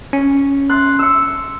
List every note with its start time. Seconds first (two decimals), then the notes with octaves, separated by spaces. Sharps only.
0.13 C#4
0.69 C6 F#6 A6
0.99 E6 C#7